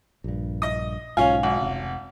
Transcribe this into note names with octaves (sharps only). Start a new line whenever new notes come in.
A#1 G2
D#5 D#6
B1 G#2 C#4 F4 F5 G#5
G#1 F#5
F1 C3